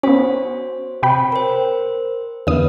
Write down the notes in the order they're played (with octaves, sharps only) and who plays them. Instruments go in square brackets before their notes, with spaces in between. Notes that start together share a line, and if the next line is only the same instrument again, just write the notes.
[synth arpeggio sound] B3 C#4 [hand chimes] F#4 C5 C#5
[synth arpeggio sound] C3 G5 B5
[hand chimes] A#4 C5
[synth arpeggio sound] E2 D3 D#6 [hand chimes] B4